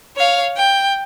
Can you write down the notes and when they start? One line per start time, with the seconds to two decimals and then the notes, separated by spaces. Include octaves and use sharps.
0.17 C#5 F5
0.57 G5